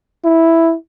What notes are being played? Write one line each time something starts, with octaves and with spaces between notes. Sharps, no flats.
E4